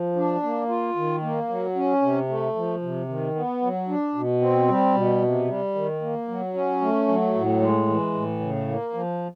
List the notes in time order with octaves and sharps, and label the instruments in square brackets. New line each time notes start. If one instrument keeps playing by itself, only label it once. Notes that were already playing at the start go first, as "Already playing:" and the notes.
Already playing: [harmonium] F3
D4
A#3
F4
D#3
A#3
F#3
C#4
C3
A3
F3
C3
D#3
B3
F#3
D4
B2
C4
G3
B2
C3
G3
D#3
A#3
F#3
C#4
A3
F#3
A2
G#3
E3
A2
C#3
A#3
F3